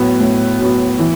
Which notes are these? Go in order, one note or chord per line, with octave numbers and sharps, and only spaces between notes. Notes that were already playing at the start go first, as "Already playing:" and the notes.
Already playing: A2 F#3 B3 F#4
A2
F#3 B3 F#4
E3